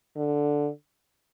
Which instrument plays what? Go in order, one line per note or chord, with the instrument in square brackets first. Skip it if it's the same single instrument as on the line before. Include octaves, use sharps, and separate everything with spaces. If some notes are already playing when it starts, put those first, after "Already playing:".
[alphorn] D3